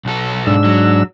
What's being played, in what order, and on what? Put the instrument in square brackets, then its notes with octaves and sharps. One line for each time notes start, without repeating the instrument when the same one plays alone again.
[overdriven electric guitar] B1 A4
[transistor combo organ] G#2 D4 E6
[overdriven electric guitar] F#3